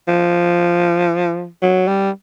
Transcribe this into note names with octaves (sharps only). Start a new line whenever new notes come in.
F3
F#3
G3